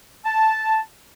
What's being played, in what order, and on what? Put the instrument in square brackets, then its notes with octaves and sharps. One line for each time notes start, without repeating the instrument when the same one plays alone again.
[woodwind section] A5